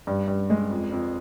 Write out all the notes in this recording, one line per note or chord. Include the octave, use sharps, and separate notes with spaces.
G2
G2
G#3
F2
F2